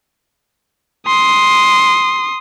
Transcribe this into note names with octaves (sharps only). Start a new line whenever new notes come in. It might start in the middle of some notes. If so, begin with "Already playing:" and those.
C6 D#6